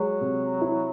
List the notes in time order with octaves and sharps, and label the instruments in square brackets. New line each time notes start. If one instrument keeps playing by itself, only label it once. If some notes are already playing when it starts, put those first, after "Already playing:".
Already playing: [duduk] F#3 [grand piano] G#3
[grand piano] C3
E4